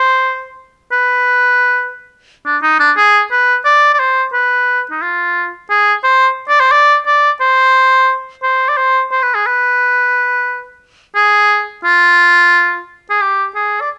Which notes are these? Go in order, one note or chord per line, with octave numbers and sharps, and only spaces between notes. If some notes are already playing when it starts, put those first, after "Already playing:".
Already playing: C5
B4
D4
D#4
D4
G#4
B4
D5
D5
C5
B4
D#4
F4
G#4
C5
D5
C5
D5
D5
C5
C5
D5
C5
C5
B4
G#4
B4
G#4
F4
G#4
G4
G#4
D5